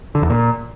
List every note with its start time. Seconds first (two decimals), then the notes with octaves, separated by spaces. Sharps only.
0.15 D3
0.22 E2
0.30 A#2